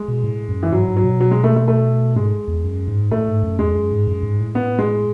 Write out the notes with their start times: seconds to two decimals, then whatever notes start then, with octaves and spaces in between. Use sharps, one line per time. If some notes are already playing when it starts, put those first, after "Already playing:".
Already playing: G#3
0.08 B2
0.24 A2
0.48 F#2
0.63 E3
0.72 G#2 F#3
0.88 G#2
0.97 F#3
1.04 B2
1.20 F#3
1.31 G#3
1.44 A3
1.56 A3
1.68 A3
2.16 G#2 G#3
2.48 E2
2.64 F#2
2.88 G#2
3.11 A2 A3
3.28 G#2
3.43 F#2
3.59 E2 G#3
3.75 F#2
3.91 G#2
4.07 F#2
4.23 G#2
4.39 A2
4.55 B3
4.79 G#3